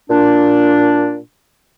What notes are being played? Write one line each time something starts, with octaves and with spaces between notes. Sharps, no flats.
A#2 D4